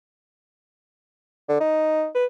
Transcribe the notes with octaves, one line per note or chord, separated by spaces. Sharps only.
D3
D#4
B4